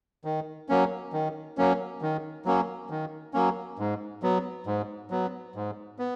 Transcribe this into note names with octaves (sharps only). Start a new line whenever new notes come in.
D#3
F#3 A#3 C#4
D#3
F#3 A#3 C#4
D#3
F#3 A#3 C#4
D#3
F#3 A#3 C#4
G#2
F#3 B3
G#2
F#3 B3
G#2
B3